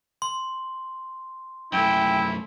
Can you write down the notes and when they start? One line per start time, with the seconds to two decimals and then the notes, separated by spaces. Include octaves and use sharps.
0.22 C6
1.73 F#2 A3 E4 G5